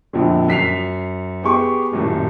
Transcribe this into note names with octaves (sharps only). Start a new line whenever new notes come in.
A#1 F2 D3
F#2 B6 C7 F7
B3 G4 G#4 C#6 D6
D#1 F#2 A2